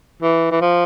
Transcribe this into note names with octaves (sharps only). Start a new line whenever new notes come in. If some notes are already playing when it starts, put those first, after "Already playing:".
E3
E3
F3